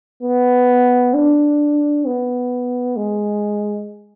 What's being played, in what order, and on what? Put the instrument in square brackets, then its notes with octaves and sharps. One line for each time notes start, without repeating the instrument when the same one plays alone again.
[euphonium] B3
D4
B3
G#3